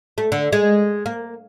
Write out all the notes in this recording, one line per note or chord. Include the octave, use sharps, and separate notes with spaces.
A3
D3
G#3
A#3